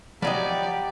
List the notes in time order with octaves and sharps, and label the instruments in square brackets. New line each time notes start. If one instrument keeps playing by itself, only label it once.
[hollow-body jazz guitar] F3 F#3 D#5 [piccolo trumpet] G4 [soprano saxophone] D5 [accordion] F#5 B5